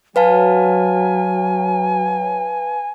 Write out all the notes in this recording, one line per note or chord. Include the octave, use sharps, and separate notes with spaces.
F#3 B4 F5 G#5 A5